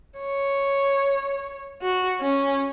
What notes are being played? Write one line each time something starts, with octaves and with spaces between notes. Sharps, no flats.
C#5
F#4
C#4